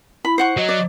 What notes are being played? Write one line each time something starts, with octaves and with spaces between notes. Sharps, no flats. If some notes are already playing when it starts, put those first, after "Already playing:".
E4 B5
C5 F#5 C#6
F#3 D#5
D5